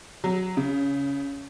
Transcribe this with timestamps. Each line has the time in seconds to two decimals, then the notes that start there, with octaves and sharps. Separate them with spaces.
0.24 F#3
0.57 C#3